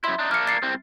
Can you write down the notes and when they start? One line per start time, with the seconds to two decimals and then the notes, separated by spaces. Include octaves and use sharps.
0.04 F#2 E4 E5 C6
0.19 D4 D#4
0.31 A#3 D4 F6 C#7
0.47 A6 C7 C#7
0.63 C2 C4